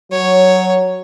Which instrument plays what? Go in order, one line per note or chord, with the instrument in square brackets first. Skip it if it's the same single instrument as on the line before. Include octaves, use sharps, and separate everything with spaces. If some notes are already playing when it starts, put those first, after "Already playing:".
[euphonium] F#3 [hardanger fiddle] C#5